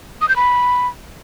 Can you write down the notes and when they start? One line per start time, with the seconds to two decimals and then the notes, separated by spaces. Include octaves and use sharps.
0.21 D#6
0.29 G6
0.36 B5